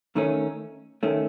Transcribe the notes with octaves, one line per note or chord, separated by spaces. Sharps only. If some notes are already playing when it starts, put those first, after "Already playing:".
D#3 A3 C#4
D#3 A3 C#4